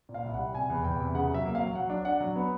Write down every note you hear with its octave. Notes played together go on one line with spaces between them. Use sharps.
A#2
F5
C2
F#5
G3
C3 G#5
E2
E2 G5
C3
C#3 F#5
F#3 E5
A#3
F5
F#3
F#3 F#5
D4
D4 F#5
F#3
B3